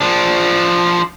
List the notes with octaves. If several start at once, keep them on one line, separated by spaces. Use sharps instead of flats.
F3 D4